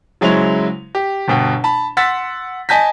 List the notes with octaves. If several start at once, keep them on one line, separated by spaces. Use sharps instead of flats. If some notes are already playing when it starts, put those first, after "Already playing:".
C#3 F#3 G#3 E4 C5 F7
G4
G1 B2 G5
A5 B5
F#5 C6 E6 A6 B6
D#5 G#5 A5 G6 A#6 B6